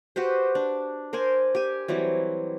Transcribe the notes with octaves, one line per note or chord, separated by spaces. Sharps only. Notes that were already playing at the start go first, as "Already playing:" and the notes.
F#4 G4 B4 C5
D4
A#4 C5 D5 G#5
G4 G#5
E3 F#3 G3 C4